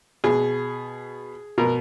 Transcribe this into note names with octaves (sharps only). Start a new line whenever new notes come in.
B2 G#4
B2 A#4